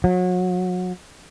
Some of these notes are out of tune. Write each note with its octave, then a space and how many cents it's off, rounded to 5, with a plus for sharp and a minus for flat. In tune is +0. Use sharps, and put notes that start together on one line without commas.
F#3 -30